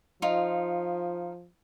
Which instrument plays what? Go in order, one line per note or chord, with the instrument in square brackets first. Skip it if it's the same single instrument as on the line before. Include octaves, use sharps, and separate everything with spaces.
[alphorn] F3 [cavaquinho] D#4 F4